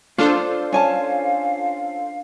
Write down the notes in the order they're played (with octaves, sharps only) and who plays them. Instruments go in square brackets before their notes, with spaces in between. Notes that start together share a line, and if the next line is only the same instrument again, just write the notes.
[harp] D4 [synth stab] F4 A4 C5 [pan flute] F5
[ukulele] C#4 G#5 A5